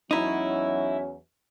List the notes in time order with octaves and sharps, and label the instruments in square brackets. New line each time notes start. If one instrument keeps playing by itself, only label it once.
[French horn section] E2 F#3 C#4 [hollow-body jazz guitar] D#4 E4